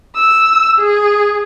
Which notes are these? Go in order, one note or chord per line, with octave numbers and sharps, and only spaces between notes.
E6
G#4